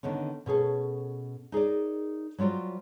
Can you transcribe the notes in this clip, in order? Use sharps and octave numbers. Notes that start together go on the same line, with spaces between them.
D3 D#3 B3 C#4
B2 C#4 G#4 A4
D#4 G#4 A#4 D5
F#3 G3 F4 F#4 C5